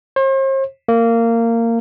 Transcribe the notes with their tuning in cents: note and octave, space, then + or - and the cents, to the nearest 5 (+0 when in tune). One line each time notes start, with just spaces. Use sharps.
C5 +45
A#3 -20